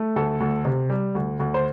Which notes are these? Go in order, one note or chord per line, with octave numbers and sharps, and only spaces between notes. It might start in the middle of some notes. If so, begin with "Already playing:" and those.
Already playing: A3
D2 A4
D2
C3
G3
D2
D2
C5